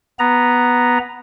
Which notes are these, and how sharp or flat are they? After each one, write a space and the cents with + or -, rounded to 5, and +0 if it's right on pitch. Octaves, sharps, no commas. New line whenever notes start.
B3 +0 A#5 +0